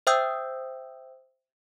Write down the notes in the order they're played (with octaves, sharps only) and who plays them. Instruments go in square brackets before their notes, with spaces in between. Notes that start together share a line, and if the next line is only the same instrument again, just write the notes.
[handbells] C5 E5 G5 D#6 E6 G6